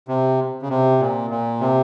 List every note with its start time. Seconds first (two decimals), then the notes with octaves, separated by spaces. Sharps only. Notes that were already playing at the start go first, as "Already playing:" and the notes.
0.08 C3
0.62 C#3
0.69 C3
1.00 A#2
1.30 A#2
1.60 C3